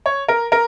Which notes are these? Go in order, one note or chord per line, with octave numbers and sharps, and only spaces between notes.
C#5
A#4
A#4